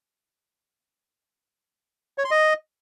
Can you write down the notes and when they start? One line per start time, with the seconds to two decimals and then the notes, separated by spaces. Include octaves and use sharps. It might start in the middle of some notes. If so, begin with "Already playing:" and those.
2.18 C#5
2.24 C6
2.31 D#5